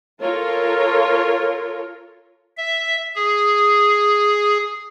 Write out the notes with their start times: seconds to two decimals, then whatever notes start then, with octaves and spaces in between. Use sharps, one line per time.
0.21 F4 A4 A#4 C#5
2.57 E5
3.16 G#4